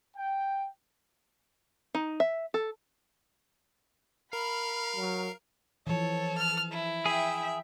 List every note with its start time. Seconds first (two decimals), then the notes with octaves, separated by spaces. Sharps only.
0.17 G5
1.95 D#4
2.20 E5
2.54 A4
4.33 A#4 F5 B5
4.96 F#3
5.87 E3 F3 A4 C#5
6.37 F6
6.71 E4
7.06 G#4 E5 G5